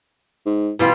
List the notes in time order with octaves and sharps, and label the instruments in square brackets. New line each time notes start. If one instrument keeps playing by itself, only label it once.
[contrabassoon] G#2
[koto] B2 G3 F4 [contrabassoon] E3